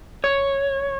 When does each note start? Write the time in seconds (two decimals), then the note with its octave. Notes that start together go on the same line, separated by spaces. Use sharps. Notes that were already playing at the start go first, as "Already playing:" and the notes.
0.24 C#5